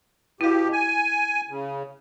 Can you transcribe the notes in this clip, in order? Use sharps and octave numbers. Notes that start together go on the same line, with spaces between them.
B2 E4 G4 F5
G#5
C#3